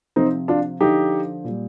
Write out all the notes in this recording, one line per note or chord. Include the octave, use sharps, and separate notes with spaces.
C3 F3 C4 D#4
D4 F4
D3 F3 D#4 G4
A#2 G3